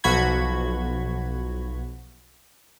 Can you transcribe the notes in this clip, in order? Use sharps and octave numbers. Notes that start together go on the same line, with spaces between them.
B1 F3 F#4 B5 G#6